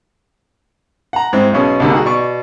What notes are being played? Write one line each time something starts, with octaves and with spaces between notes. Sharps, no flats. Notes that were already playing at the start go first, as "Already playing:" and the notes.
F#5 A#5
G#2 C4 E4
B1 B2 C#4 G#4
C2 B2 D3 G3 A#3
D#4 F#4 G#4
B2 D5 C#6